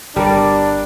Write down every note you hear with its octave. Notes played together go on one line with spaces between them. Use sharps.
G1 G3 D4 A#4 D5